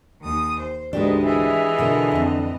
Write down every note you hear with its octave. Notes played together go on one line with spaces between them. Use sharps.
D#2 D#6
C5
D2 G#2 G#3 D4 G4 B4 D#5
E3 G#4 D#5 E5 G#5
B2 D3 F4 A#4
F2 A2